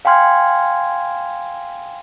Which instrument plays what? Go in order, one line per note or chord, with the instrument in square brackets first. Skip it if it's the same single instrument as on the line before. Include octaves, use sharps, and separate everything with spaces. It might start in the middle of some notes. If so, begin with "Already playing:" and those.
[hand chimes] F5 G5 G#5 C6 F6 G#6